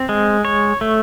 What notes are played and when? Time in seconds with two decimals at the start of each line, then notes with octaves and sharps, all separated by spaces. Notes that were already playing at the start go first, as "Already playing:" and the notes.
Already playing: C4
0.09 G#3
0.45 C#5
0.81 A3